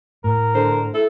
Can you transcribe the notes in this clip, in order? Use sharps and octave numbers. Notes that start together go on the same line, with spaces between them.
A2 A#4
D3 C5
E4 A4